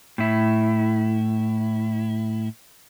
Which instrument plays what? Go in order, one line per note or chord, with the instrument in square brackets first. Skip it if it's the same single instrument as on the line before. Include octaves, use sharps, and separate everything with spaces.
[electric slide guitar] A2 E4